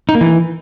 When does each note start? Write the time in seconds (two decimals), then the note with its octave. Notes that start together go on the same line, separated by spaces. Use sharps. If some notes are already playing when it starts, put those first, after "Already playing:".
0.09 D#4
0.15 A#3
0.21 E3